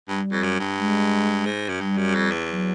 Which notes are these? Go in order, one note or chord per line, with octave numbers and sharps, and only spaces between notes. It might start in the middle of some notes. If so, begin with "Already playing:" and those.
G2 G3
F2
F#2
G2
G#3
G#2
F#2
G2 G3
F#2
F2
E2
F#3